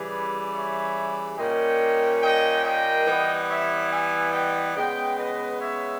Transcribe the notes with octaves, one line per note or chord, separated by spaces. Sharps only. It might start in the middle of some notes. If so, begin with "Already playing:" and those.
Already playing: C#3 E3 G3 G#4 B4
C#5 E5
A#2 G3 A#3 C#4 D#5 G5
D#5 G5
D#5 G5
E3 G3 B3
C#5 E5
E5 G#5
D#5 G5
C#3 G#3 B3 D#5 G5
B4 D#5
C#5 E5